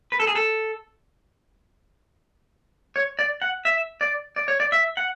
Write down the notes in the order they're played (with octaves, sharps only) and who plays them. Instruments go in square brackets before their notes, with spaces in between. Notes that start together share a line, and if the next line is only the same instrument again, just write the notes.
[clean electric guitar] B4
A4
G#4
A4
C#5
D5
F#5
E5
D5
D5
C#5
D5
E5
F#5